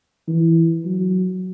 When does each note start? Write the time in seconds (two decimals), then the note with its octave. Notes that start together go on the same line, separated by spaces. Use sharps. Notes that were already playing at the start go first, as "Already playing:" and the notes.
0.28 E3
0.85 F#3